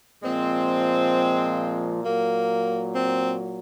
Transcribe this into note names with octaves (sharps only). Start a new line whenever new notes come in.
A#2 F3 G#3 C4
A#2 F#3 A#3
C4